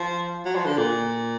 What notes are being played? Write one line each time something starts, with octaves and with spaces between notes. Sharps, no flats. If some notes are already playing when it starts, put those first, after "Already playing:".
Already playing: F3
F#3
F3
D3
A#2